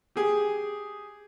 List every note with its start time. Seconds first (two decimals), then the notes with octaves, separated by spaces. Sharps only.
0.16 G4 G#4